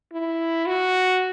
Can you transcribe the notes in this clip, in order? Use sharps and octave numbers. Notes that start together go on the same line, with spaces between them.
E4
F#4